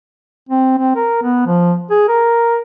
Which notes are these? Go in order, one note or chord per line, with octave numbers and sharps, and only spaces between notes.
C4
C4
A#4
B3
F3
G#4
A#4